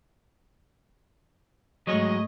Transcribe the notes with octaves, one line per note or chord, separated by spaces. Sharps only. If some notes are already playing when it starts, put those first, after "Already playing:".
G#2 F#3 G#3 A3 C#5 D#5